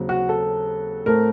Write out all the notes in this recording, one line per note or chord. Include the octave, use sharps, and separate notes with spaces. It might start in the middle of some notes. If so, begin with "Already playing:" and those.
Already playing: D#2 C#3 F#3 C4
F#4
A4
A2 A3 C4 A#4